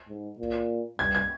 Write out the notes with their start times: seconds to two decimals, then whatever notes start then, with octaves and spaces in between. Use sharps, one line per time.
0.08 G#2
0.39 A#2
0.99 G2 G#6
1.15 G#6